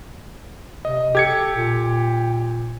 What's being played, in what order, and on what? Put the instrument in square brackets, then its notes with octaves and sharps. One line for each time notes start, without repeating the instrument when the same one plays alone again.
[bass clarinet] C3 [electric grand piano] D#5
[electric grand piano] G4 G#6 C#7 [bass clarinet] A4
[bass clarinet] A#2